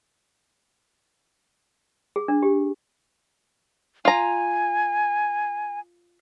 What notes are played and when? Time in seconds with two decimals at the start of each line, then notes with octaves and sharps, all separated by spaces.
2.16 G#4
2.28 D4
2.43 G4
4.05 F4 G#5 A#5